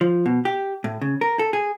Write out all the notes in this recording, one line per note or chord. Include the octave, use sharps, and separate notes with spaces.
F3
B2
G4
A2
C#3
A#4
A4
G#4